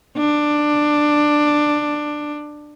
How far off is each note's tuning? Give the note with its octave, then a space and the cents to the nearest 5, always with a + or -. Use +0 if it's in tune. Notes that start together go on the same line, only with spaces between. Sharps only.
D4 +10